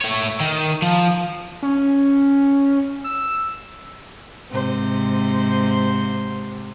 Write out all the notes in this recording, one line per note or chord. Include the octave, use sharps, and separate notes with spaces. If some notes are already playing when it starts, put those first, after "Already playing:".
A3 C#5
D#3
F3
C#4
E6
G#2 C3 C5